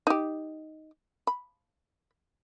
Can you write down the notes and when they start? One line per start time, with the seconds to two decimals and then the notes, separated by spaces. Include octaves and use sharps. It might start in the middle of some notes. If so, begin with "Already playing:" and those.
0.07 D#4 G4
1.27 B5